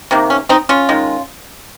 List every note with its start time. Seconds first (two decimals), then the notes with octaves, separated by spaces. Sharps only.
0.11 C3 D#3 A#3
0.30 C#4
0.49 C4 D#4
0.69 C#4 F4
0.89 D#3 G#3